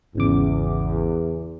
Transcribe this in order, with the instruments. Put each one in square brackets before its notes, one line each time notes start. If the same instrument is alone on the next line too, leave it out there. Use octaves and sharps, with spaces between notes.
[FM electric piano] G#1 C#3 D6 [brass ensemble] E2